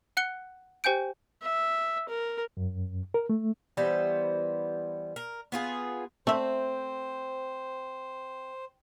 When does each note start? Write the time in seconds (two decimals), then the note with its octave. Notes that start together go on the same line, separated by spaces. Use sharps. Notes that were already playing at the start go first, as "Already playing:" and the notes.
0.17 F#5 F#6 C#7 G7
0.84 G4 C5 G5 G#5 G6 D7
1.42 E5
2.09 A#4
2.57 F#2
3.14 A#4
3.29 A3
3.77 E3 G3 B3 C5
5.16 A#4
5.52 B3 F4 G#4
6.27 A3 C4 C5 E5